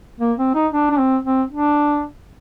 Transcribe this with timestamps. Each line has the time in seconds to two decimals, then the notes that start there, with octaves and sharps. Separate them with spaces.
0.21 A#3
0.38 C4
0.55 D#4
0.73 D4
0.91 D4
0.99 C4
1.24 C4
1.50 D4